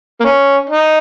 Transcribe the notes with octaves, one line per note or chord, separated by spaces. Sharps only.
A#3
C#4
D#4